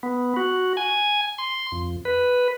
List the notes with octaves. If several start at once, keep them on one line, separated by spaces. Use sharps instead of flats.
B3
F#4
G#5
C6
F2
B4